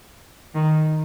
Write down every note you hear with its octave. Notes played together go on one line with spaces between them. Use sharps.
D#3